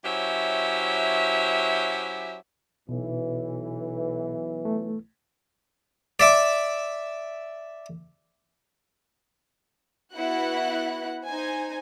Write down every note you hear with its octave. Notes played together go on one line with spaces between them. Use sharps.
F#3 C#4 E4 G4 C5 E5
B1 B2 E3
A3
D5 E5 D6
B3 E4 F#4 F#5 F#6
D#4 C5 G#5